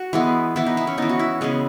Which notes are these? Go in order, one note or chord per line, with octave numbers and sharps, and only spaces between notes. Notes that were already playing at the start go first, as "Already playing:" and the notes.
Already playing: F#4
E3 G#3 B3
E3 B3 E4
D#4
E4
C#4
E3 B3 D#4
F#4
E4
C#3 G#3 B3